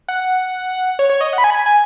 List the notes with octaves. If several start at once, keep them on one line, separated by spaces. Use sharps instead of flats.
F#5
C#5
C#5
D#5
F#5
B5
G#5
B5
G#5
G#5